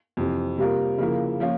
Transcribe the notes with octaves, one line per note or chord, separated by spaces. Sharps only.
F2 C3 E3
C3 G3 A#3 F4 A#4
C#3 F3 A#3 E4 A#4
F3 A#3 C#4 F4